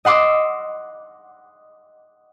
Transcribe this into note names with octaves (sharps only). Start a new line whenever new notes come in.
D#5 F#5 C6 D6 E6